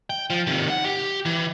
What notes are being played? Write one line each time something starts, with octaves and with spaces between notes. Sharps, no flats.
G5
F3
C3 D#3
F#5
G4
E3